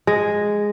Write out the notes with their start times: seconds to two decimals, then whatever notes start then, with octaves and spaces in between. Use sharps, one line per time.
0.07 G#3